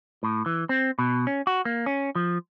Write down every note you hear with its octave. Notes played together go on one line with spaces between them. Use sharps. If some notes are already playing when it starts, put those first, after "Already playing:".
A2
E3
C4
B2
C#4
F#4
A#3
C#4
F3